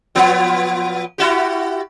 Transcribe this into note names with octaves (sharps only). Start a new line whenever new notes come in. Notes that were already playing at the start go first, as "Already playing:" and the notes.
A#2 F3 B3
E4 F#4 G4